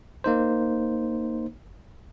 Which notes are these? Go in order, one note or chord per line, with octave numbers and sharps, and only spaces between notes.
A#3 D#4 C5